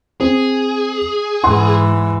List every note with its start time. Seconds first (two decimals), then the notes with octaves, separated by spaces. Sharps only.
0.20 C4 G#4
1.44 G#2 E3 F#5 C6